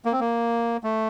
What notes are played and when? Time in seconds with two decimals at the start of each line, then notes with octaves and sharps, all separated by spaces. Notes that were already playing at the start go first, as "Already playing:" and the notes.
0.05 A#3
0.12 C4
0.20 A#3
0.84 A3